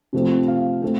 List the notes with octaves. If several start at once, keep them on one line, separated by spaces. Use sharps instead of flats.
C3 F3 A3 C4
F5
A3 C4